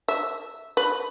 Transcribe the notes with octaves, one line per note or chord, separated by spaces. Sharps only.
E5
B4